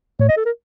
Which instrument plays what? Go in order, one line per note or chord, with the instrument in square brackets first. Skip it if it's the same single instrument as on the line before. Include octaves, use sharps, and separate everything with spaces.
[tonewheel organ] A2 [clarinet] C#5
[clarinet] D#5
A4
A#4